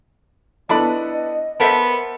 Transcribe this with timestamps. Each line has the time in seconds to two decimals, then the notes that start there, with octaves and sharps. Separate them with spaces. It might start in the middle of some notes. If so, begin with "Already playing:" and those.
0.69 B3 D4 E4 A4 B4 D#5 B5
1.60 B3 A4 A#4 C5 E5